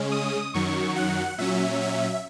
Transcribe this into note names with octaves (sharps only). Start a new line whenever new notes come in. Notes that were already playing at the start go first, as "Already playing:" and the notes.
Already playing: C#3 G#3 C#4
D#6
F#2 D#3 F#3 C#6
F#5
A#2 F#3 C#4 E5
E5